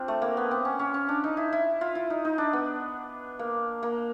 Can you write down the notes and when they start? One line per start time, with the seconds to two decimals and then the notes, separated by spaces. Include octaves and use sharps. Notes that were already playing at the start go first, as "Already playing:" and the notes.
Already playing: C4 D4 F4
0.08 A3
0.22 A#3
0.37 B3
0.51 C4
0.65 C#4
0.79 C#4
0.94 C#4
1.09 D4
1.24 D#4
1.37 E4
1.53 E4
1.81 F4
1.95 E4
2.10 D#4
2.25 D#4
2.38 D4
2.53 B3
3.39 A#3
3.83 A#3